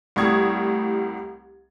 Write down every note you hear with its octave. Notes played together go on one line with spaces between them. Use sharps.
C2 A2 G3 C#6 D#6 G#6